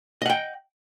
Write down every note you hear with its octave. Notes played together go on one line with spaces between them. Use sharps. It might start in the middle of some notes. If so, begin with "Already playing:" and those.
D#5 F#5 G5